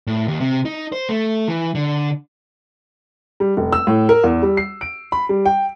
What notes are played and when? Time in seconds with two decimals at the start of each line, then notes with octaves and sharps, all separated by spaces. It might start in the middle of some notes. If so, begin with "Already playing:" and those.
0.07 A2
0.28 D#2
0.40 C3
0.65 D#4
0.92 C5
1.09 A3
1.48 E3
1.75 D3
3.40 G3
3.57 F1
3.73 E6
3.87 A2
4.09 A#4
4.24 E2
4.42 G3
4.57 C7
4.81 D7
5.12 B5
5.29 G3
5.46 G5